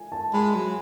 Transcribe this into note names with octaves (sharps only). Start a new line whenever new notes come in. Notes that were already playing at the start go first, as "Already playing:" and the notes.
Already playing: G#5
A5
G#3 B5
F#3